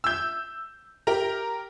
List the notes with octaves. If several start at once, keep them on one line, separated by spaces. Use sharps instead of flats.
E6 G6
G4 A#4 A#5